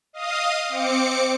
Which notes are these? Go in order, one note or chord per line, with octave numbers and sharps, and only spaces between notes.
D#5 F5 D#6
C4 D6 C#7